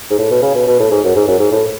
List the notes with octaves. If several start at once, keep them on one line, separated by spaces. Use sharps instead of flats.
G#2
A2
B2
C#3
B2
B2
A2
G#2
F#2
G#2
F#2
G#2
A2